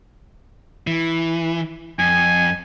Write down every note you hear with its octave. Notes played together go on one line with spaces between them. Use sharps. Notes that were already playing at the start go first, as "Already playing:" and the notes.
E3
F2 G#5